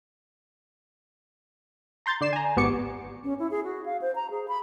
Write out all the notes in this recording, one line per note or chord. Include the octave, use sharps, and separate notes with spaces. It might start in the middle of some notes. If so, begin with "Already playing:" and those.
A#5 C6 G6 A6
D3 D5 C7 E7
G#5 A#5
G#1 B3 G4 C#6 D6 C#7
C#4
E4
G#4
F#4
F5
C5
A#5
G#4
B5